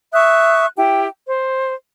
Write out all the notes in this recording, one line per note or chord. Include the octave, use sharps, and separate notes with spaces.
E5 C#6 D#6 F#6
E4 G4 G5
C5